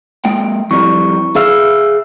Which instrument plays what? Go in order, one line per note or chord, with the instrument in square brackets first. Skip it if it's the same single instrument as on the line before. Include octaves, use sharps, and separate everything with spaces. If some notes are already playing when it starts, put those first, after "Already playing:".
[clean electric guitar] G#3 A#3 G5
[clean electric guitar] F2 G3 [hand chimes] E4 C#6
[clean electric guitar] G#4 F5 [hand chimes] E5 E6 F6